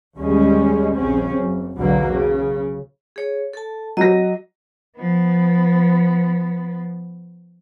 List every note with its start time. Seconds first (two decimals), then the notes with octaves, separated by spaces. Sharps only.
0.17 G1 D#2 A2 G3 G#3 C#4
0.96 A#1 C#3 C4 C#4
1.37 F#1
1.78 B1 E2 B2 D3 F#3 A#3
2.12 C#3
3.16 G#4 C#5
3.53 A4 A5
3.97 F#3 D#5 A#6
4.97 F3 B3